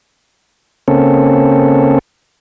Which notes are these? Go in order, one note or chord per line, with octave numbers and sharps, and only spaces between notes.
C#3 A#3 C4 C#4 A4